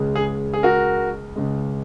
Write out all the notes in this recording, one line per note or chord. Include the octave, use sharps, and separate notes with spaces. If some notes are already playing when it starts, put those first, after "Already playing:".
Already playing: C#2 C#3 G#3
G#4
G#4
F#4 A#4
C#2 C#3 G#3